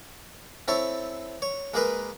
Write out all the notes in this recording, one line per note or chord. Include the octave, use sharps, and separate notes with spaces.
C4 E4 A4 C#5
C#5
G#3 A#3 G#4 A#4 B4